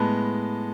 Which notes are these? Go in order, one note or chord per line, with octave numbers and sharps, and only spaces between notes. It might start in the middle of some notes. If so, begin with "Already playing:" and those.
Already playing: A2 G#3 B3 A5